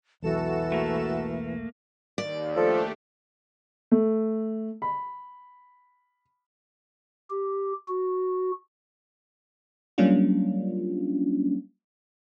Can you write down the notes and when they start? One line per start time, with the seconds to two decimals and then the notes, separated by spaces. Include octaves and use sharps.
0.22 E1 B1 E3 F#4 A4 E7
0.72 A3 A#3
2.18 D#2 D5
2.56 F3 A3 D4 G4 A4
3.91 A3
4.82 B5
7.30 G4
7.88 F#4
9.98 F#3 G3 A#3 C#4 D4 F4